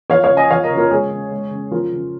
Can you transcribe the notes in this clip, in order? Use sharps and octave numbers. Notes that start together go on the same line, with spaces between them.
F3 C#5 F5
C#5 F5
C#3
D#5 G#5
F3 C#5 F5
A#4 D#5
C#3
F4 A#4
G#3 G#4 C#5
C#3
G#3
C#3
F3 F4 A#4
C#3